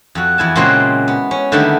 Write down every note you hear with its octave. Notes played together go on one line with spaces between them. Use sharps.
F2 F#4
E2 E4 G#5 A5
A#2 C#3 G#3 C4 C#4 F#4
B3
C#4
D3 D#3 G3 A3 B3 E4